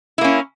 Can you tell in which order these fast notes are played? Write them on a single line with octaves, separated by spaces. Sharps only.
E4 A#3 C#4